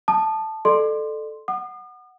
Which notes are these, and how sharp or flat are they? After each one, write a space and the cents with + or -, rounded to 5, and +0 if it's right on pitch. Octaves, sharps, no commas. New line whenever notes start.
A5 +0 D#6 -35
A4 -5 D5 +40 C6 +0
F#5 +0 D#6 -45